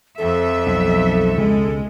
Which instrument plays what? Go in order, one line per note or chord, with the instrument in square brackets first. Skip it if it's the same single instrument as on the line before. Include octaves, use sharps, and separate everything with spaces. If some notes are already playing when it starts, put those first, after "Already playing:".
[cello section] F2 E5 [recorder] A4
[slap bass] B1
[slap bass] C#2 B2 [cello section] G#3